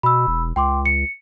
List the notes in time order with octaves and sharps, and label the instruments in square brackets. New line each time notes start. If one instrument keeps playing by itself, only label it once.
[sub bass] B2 [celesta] B5 E6
[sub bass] E1
[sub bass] C#2 [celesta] G5 C6 D6
[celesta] C#7